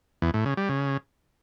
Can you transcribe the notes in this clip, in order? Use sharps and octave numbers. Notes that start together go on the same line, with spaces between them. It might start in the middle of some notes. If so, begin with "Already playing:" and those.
E2
A2
C#3
G3
C#3